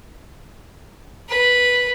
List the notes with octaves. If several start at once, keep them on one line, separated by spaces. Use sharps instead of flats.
B4